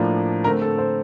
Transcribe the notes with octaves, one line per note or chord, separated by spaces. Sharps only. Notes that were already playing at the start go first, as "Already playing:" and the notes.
Already playing: A2 F3 A#3 D4
D3 A3 C4 A#4
A4
C5